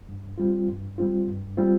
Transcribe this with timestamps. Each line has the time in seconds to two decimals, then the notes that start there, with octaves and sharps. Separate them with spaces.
0.09 G2
0.38 G3 C4 F4
0.68 G2
0.98 G3 C4 F4
1.27 G2
1.57 G3 C4 F4